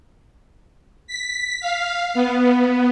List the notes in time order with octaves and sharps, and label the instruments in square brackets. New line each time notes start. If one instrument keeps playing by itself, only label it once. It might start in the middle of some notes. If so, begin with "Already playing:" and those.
[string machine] B6
F5
B3